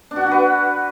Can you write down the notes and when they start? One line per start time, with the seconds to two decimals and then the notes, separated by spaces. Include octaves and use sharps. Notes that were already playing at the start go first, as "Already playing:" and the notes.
0.11 D4
0.16 F#4
0.21 F#5
0.26 F#4
0.31 B4